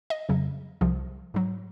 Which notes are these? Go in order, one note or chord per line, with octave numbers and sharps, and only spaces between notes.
D#5
F2 C#3 F#3
C2 C3 F3
G#2 F#3